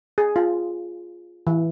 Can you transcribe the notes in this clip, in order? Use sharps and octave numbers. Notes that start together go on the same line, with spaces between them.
G#4
F4
E3